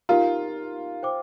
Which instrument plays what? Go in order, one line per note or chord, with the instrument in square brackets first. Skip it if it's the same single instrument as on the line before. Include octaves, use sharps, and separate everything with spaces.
[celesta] D#4 G4 A#4 F5 A#5 [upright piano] F4
[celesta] C5 G5 D6